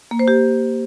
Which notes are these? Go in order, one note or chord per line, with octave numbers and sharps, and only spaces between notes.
A#3
C5
G4